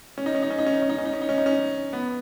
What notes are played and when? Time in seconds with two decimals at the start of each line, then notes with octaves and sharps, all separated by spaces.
0.18 C#4
0.26 D#4
0.35 C#4
0.43 D#4
0.50 C#4
0.59 D#4
0.66 C#4
0.73 D#4
0.82 C#4
0.89 D#4
0.98 C#4
1.05 D#4
1.13 C#4
1.22 D#4
1.29 C#4
1.38 D#4
1.46 C#4
1.93 B3